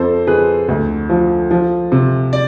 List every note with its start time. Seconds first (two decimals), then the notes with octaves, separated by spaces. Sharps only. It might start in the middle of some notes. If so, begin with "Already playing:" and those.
Already playing: F2 A4 C5
0.27 F2 G#4 B4
0.68 D2
1.10 F3
1.51 F3
1.92 C3
2.33 D5